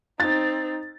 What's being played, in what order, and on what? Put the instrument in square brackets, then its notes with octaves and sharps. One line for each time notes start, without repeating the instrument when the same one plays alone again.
[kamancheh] C4 D#4 [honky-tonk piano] A6